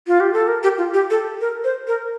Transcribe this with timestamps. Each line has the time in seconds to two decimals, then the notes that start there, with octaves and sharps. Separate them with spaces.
0.07 F4
0.20 G4
0.33 A4
0.48 A#4
0.63 G4
0.78 F4
0.94 G4
1.10 A4
1.41 A#4
1.64 C5
1.87 A#4